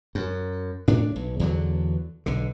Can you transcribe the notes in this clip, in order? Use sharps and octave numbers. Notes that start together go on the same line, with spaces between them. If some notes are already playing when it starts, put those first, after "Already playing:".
F#2
A2 D4
B1
E2 D3 F#3
B1 D3